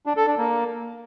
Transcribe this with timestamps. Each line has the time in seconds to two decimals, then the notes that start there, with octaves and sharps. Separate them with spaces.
0.06 D4
0.17 A4
0.27 D4
0.38 A#3